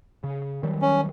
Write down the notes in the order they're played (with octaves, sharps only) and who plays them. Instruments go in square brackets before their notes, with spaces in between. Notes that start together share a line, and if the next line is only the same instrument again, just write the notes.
[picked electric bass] C#3
D#3 F#3 G3
[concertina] C#4